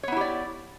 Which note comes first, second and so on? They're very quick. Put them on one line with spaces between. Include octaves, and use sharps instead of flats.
C#5 B3 E4 G4 D5